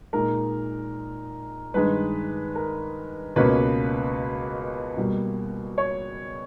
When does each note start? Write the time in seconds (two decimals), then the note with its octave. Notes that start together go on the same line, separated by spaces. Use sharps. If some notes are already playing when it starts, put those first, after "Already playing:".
0.13 A#2 G#3 D#4 A#4
1.74 G2 D#3 G#3 D#4 B4
2.55 A#4
3.36 C#2 B2 A#3 C#4 B4
4.97 B2 G3 A#3
5.78 C#5